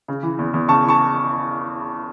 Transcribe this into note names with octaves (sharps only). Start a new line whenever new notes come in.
C#3
E3
E2
E2
C#3 A5 C#6
E3
A5 C#6